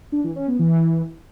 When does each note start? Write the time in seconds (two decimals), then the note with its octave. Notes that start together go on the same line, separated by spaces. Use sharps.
0.12 D4
0.24 E3
0.36 C#4
0.47 B3
0.59 E3